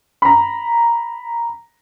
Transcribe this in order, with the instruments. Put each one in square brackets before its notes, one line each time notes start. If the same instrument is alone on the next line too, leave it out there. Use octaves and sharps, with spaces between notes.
[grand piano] A#5 B5